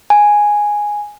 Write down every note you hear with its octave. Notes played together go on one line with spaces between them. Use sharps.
G#5